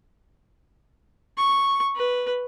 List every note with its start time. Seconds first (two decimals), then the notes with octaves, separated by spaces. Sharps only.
1.38 C#6
1.95 B4